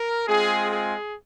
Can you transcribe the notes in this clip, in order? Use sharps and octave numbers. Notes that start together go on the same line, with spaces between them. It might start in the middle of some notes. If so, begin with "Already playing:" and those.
Already playing: A#4
G#3 C4 F4 G#4
G#4